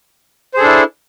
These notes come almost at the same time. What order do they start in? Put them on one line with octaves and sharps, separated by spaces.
C5 G#4 A4 D4 E4